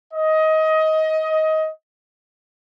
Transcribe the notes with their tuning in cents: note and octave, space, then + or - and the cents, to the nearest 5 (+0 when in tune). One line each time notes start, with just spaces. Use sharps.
D#5 +20